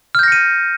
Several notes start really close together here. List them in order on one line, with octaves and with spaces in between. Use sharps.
F6 G6 A#6 C#7 D#7